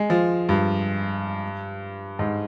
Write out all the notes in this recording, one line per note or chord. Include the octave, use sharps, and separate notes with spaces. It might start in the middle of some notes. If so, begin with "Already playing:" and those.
Already playing: G#3
F3
G2
G#2